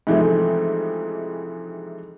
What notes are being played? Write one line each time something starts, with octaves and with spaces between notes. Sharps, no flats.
G#2 C3 E3 F3 G#3 A3